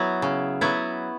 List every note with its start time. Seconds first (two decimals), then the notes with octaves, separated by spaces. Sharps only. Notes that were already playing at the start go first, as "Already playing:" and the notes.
Already playing: F#3 B3 E4
0.22 C#3
0.61 F#3 B3 E4